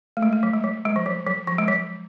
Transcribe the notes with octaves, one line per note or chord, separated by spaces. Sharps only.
A3
G#3
A3
F#3
G#3
F#3
G#3
F3
F#3
F#3
F3
G#3
F#3